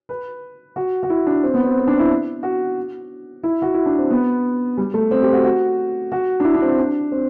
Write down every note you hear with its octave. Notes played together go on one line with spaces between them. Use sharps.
B4
F#4
F#4
E4
D4
C4
B3
C4
C4
D4
E4
F#4
E4
F#4
E4
D4
C4
B3
G3
A3
C4
G4
F#4
F#4
F#4
D4
E4
D4
C4
D4
C4